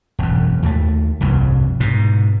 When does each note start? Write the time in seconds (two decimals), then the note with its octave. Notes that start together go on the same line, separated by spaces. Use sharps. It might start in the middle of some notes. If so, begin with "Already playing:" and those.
0.19 E1 F#2
0.63 D#2 A3
1.21 F1 C2 G2
1.80 G#2 B2